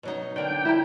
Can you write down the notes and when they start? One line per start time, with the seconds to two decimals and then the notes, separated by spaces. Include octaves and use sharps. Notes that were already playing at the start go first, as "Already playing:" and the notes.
0.03 B2 F#3 D#4
0.36 D3 A#3 G5
0.50 D4
0.65 E4 A#5